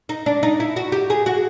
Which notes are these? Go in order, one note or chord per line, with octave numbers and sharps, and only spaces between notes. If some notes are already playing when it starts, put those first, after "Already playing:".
D#4
D4
D#4
E4
F#4
G4
G#4
F#4